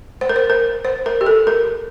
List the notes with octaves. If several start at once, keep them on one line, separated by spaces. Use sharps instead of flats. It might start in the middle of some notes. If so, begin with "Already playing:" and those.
C5
A#4
C5
A#4
C5
A#4
G4
A4
A#4